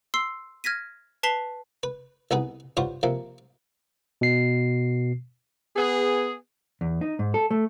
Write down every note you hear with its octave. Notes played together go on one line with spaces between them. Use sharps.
C6 E6 C7
F6 G#6 A#6 B6 D#7
B4 A5 B6 C7 F7 G7
B4
C2 B3 D#4 G#4 B4
G2 F4 C5 C#5 F#5
C3 F3 A#3
B2 C7
B3 G#4
E2
D#4
G#2
A4
A3